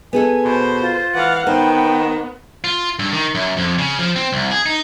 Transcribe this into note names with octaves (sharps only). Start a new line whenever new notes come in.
B3 G#4 A4 G#5
B2 C5
F4
E3 F5 F#5
D#3 B3 C5 G5
F4
G2
D#3
F#2
F2
C#3
F3
C4
C2
G#4
D#4